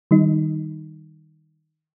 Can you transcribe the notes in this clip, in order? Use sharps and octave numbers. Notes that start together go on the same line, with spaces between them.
D#3 G3 D#4